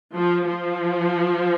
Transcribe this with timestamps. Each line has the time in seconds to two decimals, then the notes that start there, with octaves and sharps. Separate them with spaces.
0.13 F3
0.48 F3